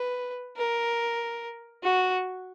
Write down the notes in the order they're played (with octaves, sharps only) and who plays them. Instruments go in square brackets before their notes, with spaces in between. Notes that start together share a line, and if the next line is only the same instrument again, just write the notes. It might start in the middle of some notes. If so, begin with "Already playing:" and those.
Already playing: [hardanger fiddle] B4
A#4
F#4